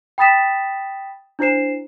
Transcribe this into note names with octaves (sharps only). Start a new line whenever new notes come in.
G5 B5 D#6 A6 B6 E7
D4 E4 C5 C7 E7